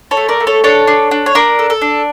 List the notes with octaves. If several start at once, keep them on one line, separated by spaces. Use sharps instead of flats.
A4 C#5
A3
A#4 D5
A3
A4 C#5
D4 A4 C#5
D4
D4
C#5
D4 A#4
A4
A4
D4